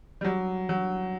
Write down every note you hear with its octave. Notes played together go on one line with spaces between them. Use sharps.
G3
F#3
F#3